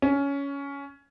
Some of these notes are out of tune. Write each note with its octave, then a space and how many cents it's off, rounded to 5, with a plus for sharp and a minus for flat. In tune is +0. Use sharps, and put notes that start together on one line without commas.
C#4 +15